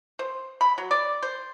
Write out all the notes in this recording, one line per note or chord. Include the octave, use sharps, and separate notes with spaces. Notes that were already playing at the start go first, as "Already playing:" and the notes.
C5
B5
F#3
D5
C5